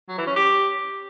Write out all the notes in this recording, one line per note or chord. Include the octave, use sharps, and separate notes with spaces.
F#3
E3
C#4
G4